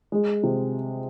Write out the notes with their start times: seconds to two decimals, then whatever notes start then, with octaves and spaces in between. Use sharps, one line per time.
0.12 G#3
0.43 C3